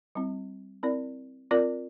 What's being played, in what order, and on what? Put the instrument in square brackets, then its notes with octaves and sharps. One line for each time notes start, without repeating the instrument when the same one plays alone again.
[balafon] G3 C4 E4
C4 E4 A#4 D5
C4 F4 A#4 D5